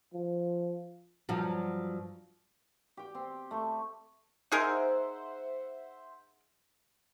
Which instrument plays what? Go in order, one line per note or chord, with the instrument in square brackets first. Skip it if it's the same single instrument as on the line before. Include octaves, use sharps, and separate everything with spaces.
[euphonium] F3
[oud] G2 F3 F#3
[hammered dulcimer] G4 G5
C4
A3 C#6
[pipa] D#4 G#4 A#4 [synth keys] C5 E5 F#5